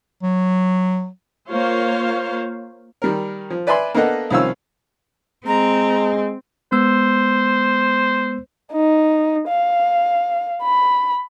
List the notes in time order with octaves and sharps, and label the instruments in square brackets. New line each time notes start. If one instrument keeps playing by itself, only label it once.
[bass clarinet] F#3
[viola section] A#3 F4 C5 C#5 F5
[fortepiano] D#3 G3 A#4
F3
B4 D5 E5 G#5 B5 C6
A#3 B3 D4 A4 D#5 F#5
C2 D#3 F3 C#4 F5 E6
[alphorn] G#3 [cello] C4 [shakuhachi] A#5
[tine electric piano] G#3 B3 E6 [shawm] C5
[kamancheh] D#4
F5
B5